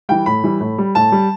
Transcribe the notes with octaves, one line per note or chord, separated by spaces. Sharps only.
E3 G3 G5
A2 B5
E3 G3
A2
G3
A2 A5
G3